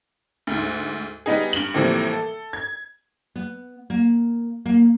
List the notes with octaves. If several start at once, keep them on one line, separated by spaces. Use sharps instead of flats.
D2 G#2
G3 B3 D#4 G#4
G2 F#7
A2 C3 E3 F3 G3 A#3
A4
G#6
B3
A#3
A#3